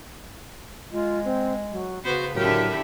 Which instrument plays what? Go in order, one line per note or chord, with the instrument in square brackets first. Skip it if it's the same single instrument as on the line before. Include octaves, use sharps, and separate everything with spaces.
[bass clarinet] G#3 [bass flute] F4
[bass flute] C4
F#3
[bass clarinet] C#3 [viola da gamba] B3 C5 [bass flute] F#4
[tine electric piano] A2 F#3 [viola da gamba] D3 E4 G4 [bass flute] A#4